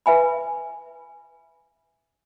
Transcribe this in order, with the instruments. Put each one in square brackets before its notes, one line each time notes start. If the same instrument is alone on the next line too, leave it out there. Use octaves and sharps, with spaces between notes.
[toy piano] B4 E5 G#5 B5